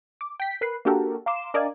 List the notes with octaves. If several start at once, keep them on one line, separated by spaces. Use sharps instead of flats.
D6
G5 B6
A#4 B4 F#6 C7
A#3 D4 F#4 G4 A4 A#4
F5 A#5 C6 D6 E7
D4 A#4 D5 D#5 F5 G#5